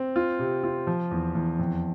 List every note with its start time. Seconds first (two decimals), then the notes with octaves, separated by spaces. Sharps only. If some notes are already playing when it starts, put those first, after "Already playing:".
Already playing: C4
0.16 F4
0.39 C3
0.64 F4
0.87 F3
1.11 E2
1.35 E2
1.59 F2